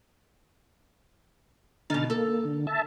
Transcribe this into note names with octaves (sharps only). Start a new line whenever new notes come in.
B2 D3 D#4 F6 A6
A#3 A4
D3
E5 A5